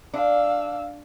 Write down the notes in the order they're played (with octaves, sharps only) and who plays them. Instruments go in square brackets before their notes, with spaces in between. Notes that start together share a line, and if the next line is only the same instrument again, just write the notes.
[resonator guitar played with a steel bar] D4 [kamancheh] F5 E6